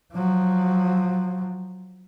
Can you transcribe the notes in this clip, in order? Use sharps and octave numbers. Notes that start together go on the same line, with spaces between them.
F3 F#3